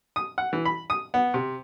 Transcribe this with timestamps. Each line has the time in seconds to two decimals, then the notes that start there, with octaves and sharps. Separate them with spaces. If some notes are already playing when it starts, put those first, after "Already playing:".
0.16 D#6
0.38 F#5
0.53 E3
0.65 B5
0.90 D#6
1.14 B3
1.34 C3